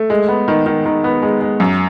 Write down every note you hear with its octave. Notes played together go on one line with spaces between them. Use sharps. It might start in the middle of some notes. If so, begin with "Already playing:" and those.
Already playing: A3
G#3
B3
D#3
D#3
D#3
B3
G#3
G#3
F#2